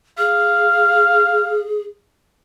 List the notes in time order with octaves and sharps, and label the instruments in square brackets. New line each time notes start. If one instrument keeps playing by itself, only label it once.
[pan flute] G#4 [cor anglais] F5